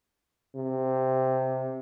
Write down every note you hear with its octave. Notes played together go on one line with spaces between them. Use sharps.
C3